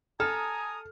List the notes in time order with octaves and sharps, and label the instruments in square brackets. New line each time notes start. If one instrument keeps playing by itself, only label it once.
[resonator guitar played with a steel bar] A4 [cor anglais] G#5 [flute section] A#5 D#6 [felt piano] F6